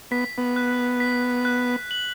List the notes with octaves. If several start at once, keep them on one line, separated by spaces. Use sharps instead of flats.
B3 B6
B3
F#6
B6
F#6
F#7